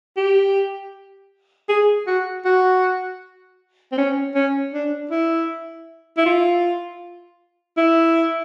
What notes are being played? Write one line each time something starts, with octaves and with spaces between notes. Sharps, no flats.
G4
G#4
F#4
F#4
C4
C#4
C#4
D4
E4
E4
F4
E4